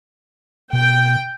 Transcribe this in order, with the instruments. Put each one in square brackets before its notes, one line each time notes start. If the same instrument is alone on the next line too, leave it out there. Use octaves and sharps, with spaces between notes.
[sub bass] B2 [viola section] G5